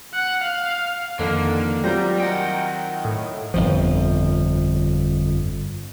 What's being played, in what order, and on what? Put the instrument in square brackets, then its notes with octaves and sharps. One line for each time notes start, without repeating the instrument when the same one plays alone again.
[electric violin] F#5
F5
[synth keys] F2 D#3 [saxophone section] D3 [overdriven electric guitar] A#3
[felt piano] F#3 C4 F4 [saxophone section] G3 [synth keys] A#5 G6 A#6
[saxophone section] D#3 [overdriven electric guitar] F#5 G5
[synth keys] A2
[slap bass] G1 F2 F3